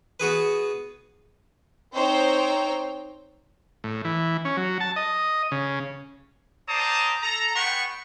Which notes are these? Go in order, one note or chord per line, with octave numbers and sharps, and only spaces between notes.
B3 F#4 G#4 B4
C4 D#4 C5 C#5 G5 A#5
A2
E3
C#4
F#3
A5
D#5
C#3
G3 C5 D5 A5 A#5 D#6
A4 A#5
G#3 B3 F#5 G5 B5 C#6